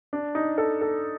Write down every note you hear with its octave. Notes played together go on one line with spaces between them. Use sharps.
D4
D#4
A4
A4